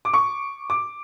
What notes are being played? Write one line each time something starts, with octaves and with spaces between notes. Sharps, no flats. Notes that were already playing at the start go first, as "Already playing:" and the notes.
D6
C#6
D6